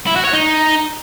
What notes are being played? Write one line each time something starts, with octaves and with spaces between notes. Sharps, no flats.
E4
F#4
C#5
D#4